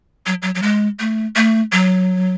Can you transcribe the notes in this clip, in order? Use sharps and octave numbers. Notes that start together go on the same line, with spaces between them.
F#3
F#3
F#3
G#3
A3
A3
F#3